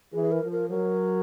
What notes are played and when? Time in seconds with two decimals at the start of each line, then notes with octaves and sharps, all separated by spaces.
0.13 E3 G#4
0.32 A#4
0.41 F3
0.52 A#4
0.70 F#3 A#4